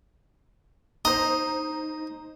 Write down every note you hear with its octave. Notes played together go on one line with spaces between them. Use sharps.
D#4 C5 D#5 A#5